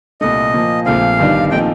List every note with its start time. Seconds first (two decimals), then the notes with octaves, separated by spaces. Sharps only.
0.21 C2 A#2 A3 D#5
0.54 A#2 F3 A#3
0.86 A#1 A#2 A3 C4 F5
1.19 G1 G2 D#3 G3 D4
1.51 A#2 F3 A3 C4 D#4 G5